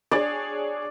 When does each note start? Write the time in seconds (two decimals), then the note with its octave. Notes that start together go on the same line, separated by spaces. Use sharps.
0.11 D4 G#4 C#5 D5